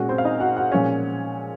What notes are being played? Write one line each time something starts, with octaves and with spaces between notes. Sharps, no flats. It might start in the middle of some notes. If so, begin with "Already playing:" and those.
Already playing: A#2 G#3 C#4 F#4
C4 C5
F5
D#4 D#5
F#4 F#5
F#4 F#5
A#2 F3 G#3 C#4 C#5